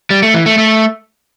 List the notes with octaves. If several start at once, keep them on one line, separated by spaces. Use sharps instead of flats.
G3
A3
E3
A3
A3